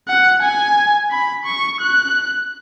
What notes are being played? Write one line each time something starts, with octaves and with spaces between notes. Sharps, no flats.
F#5
G#5
B5
C#6
F#6